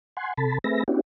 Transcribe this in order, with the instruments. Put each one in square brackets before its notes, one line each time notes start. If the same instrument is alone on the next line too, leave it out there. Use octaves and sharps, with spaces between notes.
[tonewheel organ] F#5 G#5 C6
C3 A4 A5 B5
A3 C4 G#4 B4 E5 A#6
B3 C#4 D4 E4 F#4 G4